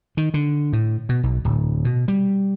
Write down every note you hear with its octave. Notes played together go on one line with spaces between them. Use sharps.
D#3
D3
A2
B2
B1
D1
B2
G3